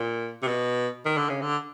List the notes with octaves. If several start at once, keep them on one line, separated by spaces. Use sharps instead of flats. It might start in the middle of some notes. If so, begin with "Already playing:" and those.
Already playing: A#2
C3
B2
D#3
D3
C#3
D3